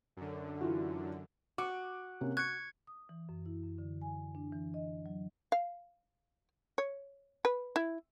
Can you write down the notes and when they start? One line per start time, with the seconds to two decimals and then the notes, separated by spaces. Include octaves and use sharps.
0.17 F#2 D3
0.61 E3 F4 F#4
1.58 F#4 D6
2.21 C3 A#3 C#4
2.37 C#6 F#6 G#6 C#7
2.87 D#6
3.09 E3
3.29 F#2
3.46 E4
3.63 F#2
3.78 D3
4.02 G#5
4.35 D4
4.53 E3
4.74 D#5
5.06 F#3
5.52 F5
6.78 C#5
7.45 B4
7.76 E4